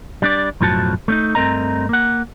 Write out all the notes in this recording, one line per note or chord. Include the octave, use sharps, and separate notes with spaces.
G3 D4 D5
B1 F#2 A2 F3 F#4 A5
A3 C#4 D#4
G2 A3 C4 A#4 D#5 A#5
A#3 F#5